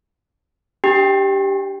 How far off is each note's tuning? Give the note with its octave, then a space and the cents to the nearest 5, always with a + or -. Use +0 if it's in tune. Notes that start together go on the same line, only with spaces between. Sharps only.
D4 +0 G4 +0 G5 +0